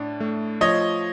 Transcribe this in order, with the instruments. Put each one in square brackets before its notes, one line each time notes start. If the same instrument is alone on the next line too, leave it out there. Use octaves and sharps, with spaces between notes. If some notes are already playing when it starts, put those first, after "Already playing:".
Already playing: [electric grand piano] A2 D4
A3
[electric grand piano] F3 [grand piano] C#5 D#5